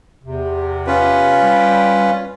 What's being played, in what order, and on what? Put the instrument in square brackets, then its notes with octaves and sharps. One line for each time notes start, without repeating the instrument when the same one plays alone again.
[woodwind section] E2 C3
[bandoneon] C#4 F4 B4
[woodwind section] G3